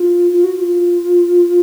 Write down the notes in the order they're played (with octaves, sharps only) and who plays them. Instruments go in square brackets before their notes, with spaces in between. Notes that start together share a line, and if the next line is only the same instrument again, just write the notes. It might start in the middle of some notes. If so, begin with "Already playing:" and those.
Already playing: [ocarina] F4
F4
F#4
F#4
F4